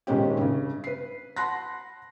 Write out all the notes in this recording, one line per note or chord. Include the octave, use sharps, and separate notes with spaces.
D#1 C3 D#3 G#3 C#4 G4
G2 C#3
B4 C7
F#5 A5 B5 C6 F#6 A#6